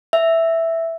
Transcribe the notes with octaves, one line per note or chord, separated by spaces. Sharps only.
E5